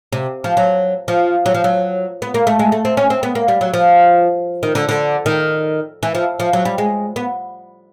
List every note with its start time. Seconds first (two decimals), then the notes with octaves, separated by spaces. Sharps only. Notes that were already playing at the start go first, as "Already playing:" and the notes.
0.12 C3
0.44 F3
0.57 F#3
1.08 F3
1.46 F#3
1.55 F3
1.64 F#3
2.22 B3
2.34 A#3
2.47 A3
2.59 G#3
2.72 A3
2.85 C4
2.97 C#4
3.10 C4
3.23 B3
3.35 A#3
3.48 G3
3.61 F#3
3.74 F3
4.63 D#3
4.75 D3
4.89 D3
5.26 D#3
6.03 E3
6.15 F3
6.40 F3
6.53 F#3
6.65 G3
6.78 G#3
7.16 B3